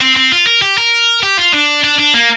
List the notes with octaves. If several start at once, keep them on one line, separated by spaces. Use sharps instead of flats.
C4
C4
F4
A#4
G4
A#4
G4
F4
D4
D4
D4
A#3